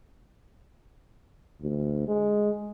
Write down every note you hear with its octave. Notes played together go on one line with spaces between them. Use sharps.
D2
G#3